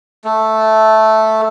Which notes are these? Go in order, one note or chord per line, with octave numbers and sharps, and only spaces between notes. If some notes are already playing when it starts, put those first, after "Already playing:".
A3